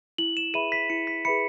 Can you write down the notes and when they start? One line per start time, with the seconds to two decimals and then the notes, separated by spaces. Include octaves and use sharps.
0.18 E4 F#7
0.37 E7
0.54 G#4 B4 E5 B5 D#7
0.72 B6
0.90 E4 C#7
1.07 B6
1.25 G#4 B4 E5 B5 C#7